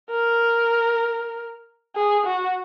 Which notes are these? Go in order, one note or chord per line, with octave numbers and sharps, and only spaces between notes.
A#4
G#4
F#4